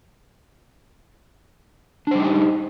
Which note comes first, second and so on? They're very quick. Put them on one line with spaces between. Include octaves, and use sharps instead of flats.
D4 C5 G3 D#4 G4